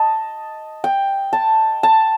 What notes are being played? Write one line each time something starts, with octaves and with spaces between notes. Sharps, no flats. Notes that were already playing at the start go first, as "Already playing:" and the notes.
Already playing: D#5 A5
G5
A5
A5